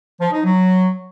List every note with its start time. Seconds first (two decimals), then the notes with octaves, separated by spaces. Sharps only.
0.20 F3
0.32 D#4
0.43 F#3